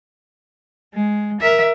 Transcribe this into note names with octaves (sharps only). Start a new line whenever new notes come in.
G#3
A#4 E5